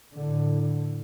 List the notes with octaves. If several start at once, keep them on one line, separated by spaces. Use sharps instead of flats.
A2 D3